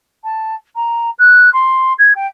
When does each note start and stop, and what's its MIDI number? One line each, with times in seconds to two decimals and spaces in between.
0.23 0.55 81
0.75 1.09 82
1.18 1.49 90
1.53 1.93 84
1.98 2.13 92
2.15 2.26 79